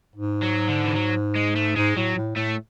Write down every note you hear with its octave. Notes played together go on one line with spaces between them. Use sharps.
G#2
F#3
D3
E3
F#3
G#3
A3
G#2 G#3
A2 F#3
A2
A2 A3